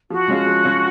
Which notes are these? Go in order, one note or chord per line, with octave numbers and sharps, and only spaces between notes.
F3 F#4
G#3 C#4 F4
F3
G#3 C#4 F4